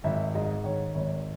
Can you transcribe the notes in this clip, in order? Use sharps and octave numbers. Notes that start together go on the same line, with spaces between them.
G#1 E5
G#2 D#5
D#3 C#5
G#1 C#5